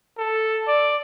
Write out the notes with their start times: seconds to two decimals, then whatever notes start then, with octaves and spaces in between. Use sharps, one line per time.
0.18 A4
0.68 D5